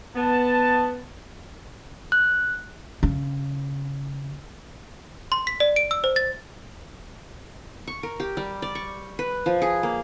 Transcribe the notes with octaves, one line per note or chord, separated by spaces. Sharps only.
B3 A5
F#6
C#3
C6
B6
D5
D7
E6
C5
A6
C#6
A#4
G4
G3
D5
C#6
B4
F3
G#4
A#3